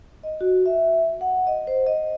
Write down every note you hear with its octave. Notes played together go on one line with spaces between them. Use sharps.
D#5
F#4
E5
F#5
D#5
C5
D#5